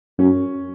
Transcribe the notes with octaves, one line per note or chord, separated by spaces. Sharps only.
F#2 C#4